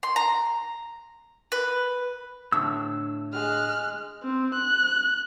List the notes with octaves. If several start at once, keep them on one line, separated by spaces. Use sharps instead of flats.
C6
A#5
B4
A2 D3 E6
G#3 F6 F#6
C4
F#6